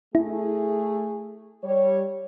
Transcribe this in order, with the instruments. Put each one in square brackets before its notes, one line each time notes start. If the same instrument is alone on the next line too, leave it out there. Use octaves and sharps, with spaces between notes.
[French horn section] A3 G#4 [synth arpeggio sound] E4
[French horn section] G3 C#5